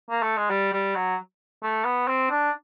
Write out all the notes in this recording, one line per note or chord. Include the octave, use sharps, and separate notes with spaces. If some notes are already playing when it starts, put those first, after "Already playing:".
A#3
A3
G#3
G3
G3
F#3
A3
B3
C4
D4